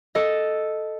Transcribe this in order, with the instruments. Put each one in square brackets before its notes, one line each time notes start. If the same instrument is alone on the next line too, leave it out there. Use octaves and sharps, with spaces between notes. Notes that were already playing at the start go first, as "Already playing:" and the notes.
[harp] A4 D#5